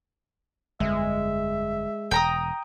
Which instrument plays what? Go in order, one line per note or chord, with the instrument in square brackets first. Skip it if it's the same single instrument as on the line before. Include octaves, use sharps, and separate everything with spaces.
[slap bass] G1 F2 [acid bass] G#3 [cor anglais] E5
[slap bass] E1 [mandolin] G5 A#5 D#6